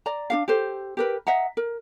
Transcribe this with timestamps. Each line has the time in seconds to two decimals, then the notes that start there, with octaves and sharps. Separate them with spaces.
0.06 D5 A#5
0.30 D4 F#4 F5
0.48 G4 A4 C5
0.97 G4 A#4 B4
1.27 D#5 E5 F#5 A#5
1.57 A#4